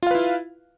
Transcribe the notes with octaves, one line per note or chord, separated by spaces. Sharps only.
E4 F4 B4 F5